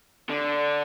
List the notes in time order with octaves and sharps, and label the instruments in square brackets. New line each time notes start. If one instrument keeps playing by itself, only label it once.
[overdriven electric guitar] D3